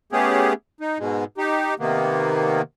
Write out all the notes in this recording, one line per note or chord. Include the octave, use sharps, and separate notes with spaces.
A3 B3 C#4 G4 G#4
D#4
G#2 B2 G#3
D#4 G4
C3 D#3 A#3 B3